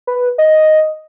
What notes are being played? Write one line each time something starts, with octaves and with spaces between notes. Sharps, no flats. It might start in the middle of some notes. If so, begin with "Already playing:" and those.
B4
D#5